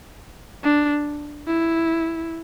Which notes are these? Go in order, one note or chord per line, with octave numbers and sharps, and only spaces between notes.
D4
E4